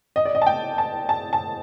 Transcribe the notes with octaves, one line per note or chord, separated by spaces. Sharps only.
D#5
D5
D#5
A5
G5
A5
A5
A5